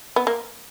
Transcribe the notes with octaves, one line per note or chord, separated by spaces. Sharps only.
B3
A#3